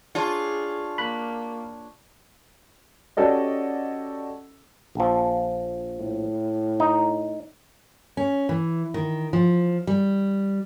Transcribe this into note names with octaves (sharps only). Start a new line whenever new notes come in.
D4 F4 G#4 C#5
A#3 B5 F#6
C#4 F#4 G4 A4 D5 D#5
A#1 F3
A2
D#4
C#4
E3
D#3
F3
G3